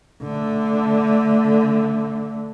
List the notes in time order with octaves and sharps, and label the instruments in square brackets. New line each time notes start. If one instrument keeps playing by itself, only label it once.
[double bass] D3 A3